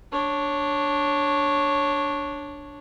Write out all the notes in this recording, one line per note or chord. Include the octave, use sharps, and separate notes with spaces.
D4 C#5